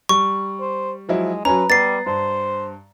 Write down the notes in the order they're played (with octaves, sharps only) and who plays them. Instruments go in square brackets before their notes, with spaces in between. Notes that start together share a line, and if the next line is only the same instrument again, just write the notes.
[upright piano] G3 [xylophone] C#6
[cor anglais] C5
[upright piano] F3 F#3 E4 [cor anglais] G#3
[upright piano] F#3 C#4 [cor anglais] B4 [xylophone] A#5
[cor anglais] G3 [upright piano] B3 [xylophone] A6 C7
[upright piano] G2 [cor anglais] C5